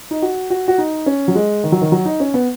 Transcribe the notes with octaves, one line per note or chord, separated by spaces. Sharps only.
D#4
F#4
F#4
F#4
D#4
C#4
F#3
G#3
D#3
F#3
D#3
F#3
D#4
C#4
B3